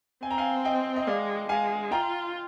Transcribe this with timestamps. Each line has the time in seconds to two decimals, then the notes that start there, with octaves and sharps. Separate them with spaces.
0.23 C4 G#5
0.31 A#5
0.38 F5 G#5
0.65 D#5 G5
0.96 D#5
1.07 G#3 D5 F5
1.49 G#3 F5 G#5
1.91 F4 G5 A#5